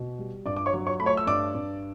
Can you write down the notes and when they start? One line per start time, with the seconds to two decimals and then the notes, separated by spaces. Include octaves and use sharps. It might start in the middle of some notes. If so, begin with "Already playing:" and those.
Already playing: B2
0.19 G3
0.46 G2 D5 D6
0.57 D6
0.66 C#5 C#6
0.74 F#3
0.87 C#5 C#6
1.00 A3 B5
1.06 C#5 C#6
1.17 E6
1.27 G2 D5 D6
1.55 G2